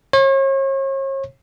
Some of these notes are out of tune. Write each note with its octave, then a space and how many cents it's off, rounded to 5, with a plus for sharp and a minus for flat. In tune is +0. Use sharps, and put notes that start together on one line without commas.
C#5 -40